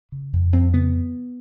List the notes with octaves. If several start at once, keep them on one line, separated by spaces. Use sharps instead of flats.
C#3
F2
F2 C4
C#3 B3